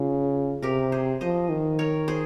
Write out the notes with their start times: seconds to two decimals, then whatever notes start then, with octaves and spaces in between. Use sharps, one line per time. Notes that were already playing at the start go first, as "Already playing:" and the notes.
Already playing: C#3 F4
0.62 C3 G4 A#4
0.92 G#4 C5
1.21 F3 C5 D#5
1.50 D#3
1.79 A#4 C#5
2.08 G#4 C5